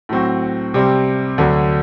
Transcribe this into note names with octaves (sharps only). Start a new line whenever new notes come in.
A2 F#3 C4 F#4
C3 G3 C4
D2 D3 F#3